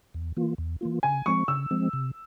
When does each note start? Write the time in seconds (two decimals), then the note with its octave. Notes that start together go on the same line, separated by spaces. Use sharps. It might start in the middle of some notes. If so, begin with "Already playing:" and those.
0.14 E2
0.37 E3 A#3 F4
0.58 E2
0.81 E3 A#3 F4
1.03 C#3 G#5
1.26 F3 G#3 C4 C#6
1.48 C#3 E6
1.71 F3 G#3 C4
1.93 C3